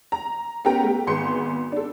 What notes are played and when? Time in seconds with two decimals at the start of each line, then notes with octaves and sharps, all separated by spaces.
0.12 A#5
0.65 B3 C#4 G4 A#4 G5 A#5
0.83 A3 G4
1.07 G#1 B3 G#4 C6 C#7
1.72 D4 A4